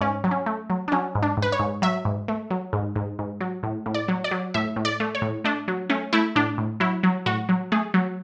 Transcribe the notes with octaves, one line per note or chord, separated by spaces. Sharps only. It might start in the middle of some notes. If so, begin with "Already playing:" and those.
G#2 C#4
F#3
C#4
A3
F#3
D4
F#3 C#4
G#2
D4
G#2
B4
C#5
G#2
F#3 E5
G#2
A3
F#3
G#2
G#2
G#2
F#3
A2
A2
D5
F#3
D5
F#3
A2 E5
A2
D5
A3
C#5
A2
A3 D4
F#3
A3 C#4
A3 E4
A2 D4
A2
F#3 E4
F#3
A2 F#4
F#3
A3 G#4
F#3